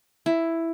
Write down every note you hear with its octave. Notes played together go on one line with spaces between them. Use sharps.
E4